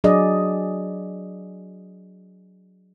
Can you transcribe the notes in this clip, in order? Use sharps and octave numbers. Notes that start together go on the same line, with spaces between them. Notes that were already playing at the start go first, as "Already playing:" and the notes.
F#3 D4 G#4 D5 D#5